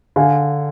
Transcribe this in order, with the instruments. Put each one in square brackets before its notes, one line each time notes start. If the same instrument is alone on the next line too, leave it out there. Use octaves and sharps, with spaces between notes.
[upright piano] D3 [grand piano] F5 G#5